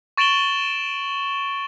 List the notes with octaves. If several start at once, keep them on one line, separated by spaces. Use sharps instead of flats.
C#6 A6 D7 E7 F#7 G7